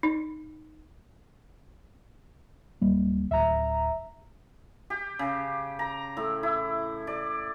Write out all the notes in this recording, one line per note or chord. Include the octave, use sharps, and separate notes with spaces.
D#4
D1 G3 A#3
D1 E5 A#5
G4
C#3
A#5
A2
E4
D5